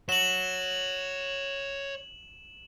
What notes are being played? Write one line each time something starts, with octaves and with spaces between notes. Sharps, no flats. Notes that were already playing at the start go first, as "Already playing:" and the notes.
C#5 F#5 E7 F#7